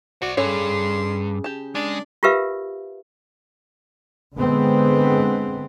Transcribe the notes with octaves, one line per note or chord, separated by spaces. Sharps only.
F#4 C5 D5
G2 C#3 C#4 A4 C#5 C6
G4 A5
G#3 D4
F4 G4 A#4 B4 E5 F5
D3 G#3 B3 C4